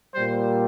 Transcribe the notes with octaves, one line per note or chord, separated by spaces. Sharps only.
A#2 G3 C5